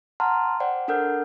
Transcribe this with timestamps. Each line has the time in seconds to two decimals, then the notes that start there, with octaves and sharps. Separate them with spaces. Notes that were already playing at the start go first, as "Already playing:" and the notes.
0.20 F#5 A5 A#5 C6 F6
0.60 C5 D5 F#5 G5
0.88 D4 A4 A#4 F#5 F6 G6